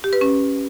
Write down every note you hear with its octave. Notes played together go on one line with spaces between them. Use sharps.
G4
B4
C#4